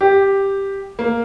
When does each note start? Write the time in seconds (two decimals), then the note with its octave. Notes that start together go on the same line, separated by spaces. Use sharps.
0.01 G4
0.99 A#3